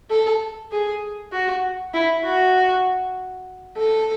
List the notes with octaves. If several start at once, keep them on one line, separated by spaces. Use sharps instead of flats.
A4
G#4
F#4
E4
F#4
A4